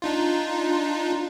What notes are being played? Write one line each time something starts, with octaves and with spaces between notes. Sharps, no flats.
D4 D#4 F4